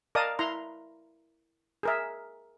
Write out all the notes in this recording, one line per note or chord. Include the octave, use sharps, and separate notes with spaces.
A#4 D5 D#5 F5 A5 D#6
E4 A#5 C6
G#4 A#4 E5